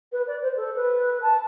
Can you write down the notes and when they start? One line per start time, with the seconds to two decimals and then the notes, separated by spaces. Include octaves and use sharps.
0.12 B4
0.27 D5
0.42 C5
0.57 A4
0.76 B4
1.22 A5